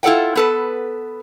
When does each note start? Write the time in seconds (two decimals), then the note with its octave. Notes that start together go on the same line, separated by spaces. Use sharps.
0.03 E4 F4 A4 D5 F#5 G5
0.35 B3 A4 B4